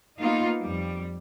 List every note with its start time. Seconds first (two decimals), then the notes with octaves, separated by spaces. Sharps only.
0.18 A#3 B3 D#4 F4
0.61 F2 G3